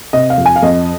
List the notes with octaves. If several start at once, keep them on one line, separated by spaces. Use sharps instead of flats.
C3 D#5
F5
F2
G#5
F5
F2 D#5